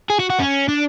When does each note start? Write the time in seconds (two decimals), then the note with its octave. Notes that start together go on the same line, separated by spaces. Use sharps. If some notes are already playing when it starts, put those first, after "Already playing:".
0.10 G#4
0.20 F#4
0.30 F#4
0.40 C#4
0.68 D4